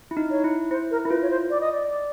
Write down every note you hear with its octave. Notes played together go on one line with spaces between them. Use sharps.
E4
D#4
C#5
E4
E4 C5
A#4
E4
F4 B4
C#5
C5
D5
D#5
D5